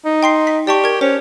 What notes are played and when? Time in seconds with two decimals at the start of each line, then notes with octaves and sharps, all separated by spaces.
0.05 D#4
0.23 G5 C6 C7
0.47 B6
0.67 G4 D5 A5 C#6
0.84 A#4 G#6
1.01 C#4 C5